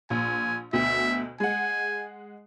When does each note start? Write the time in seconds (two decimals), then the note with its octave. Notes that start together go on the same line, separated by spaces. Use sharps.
0.10 A#1 G#5
0.73 D2 B2 E5
1.40 G#3 F#5 G#5